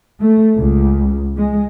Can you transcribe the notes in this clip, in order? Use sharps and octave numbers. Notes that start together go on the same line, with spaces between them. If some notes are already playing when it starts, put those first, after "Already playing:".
A3
C#2
G#3